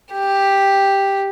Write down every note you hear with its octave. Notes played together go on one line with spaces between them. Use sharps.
G4